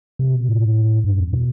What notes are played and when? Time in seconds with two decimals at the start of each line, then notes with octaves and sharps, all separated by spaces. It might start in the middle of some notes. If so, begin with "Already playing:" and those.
0.19 C3
0.34 B2
0.49 A2
1.04 G2
1.19 F2
1.33 B2